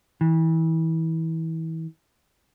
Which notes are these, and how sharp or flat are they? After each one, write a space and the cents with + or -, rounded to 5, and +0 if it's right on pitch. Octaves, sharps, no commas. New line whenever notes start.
E3 -30